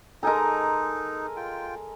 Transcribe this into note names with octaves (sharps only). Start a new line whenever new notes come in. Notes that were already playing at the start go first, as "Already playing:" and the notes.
G#3 D#4 A4 A#4 G#5 A#5
F4 G5